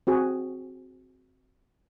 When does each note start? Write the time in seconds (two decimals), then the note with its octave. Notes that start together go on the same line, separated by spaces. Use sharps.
0.07 C4 F#4 G#4